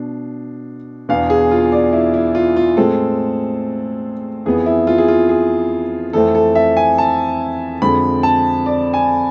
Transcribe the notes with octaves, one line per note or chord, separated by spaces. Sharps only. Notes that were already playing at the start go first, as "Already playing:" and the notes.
Already playing: B2 D4
E2 B2 B3 D4 F5
G#4
F4
D5
E4
E4
F4
F4
A2 G#3 C4 A4
F2 E3 B3 G#4
E4
F4
G#4
F4
G#4
F2 E3 A3 C4 A4
A4
E5
G#5
A5
F2 D3 G#3 C4 B5
A5
D5
G#5